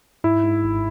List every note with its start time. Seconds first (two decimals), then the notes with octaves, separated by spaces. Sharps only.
0.24 G#2 E4
0.44 G#2
0.64 G#1